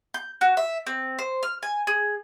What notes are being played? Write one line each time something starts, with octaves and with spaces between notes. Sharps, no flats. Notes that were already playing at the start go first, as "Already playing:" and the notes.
G6
F#4
E5
C4
C5
F6
G#5
G#4